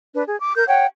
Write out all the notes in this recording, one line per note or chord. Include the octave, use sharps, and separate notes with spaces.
D4 B4
G#4
D6
A#4 G6
C#5 F#5 G5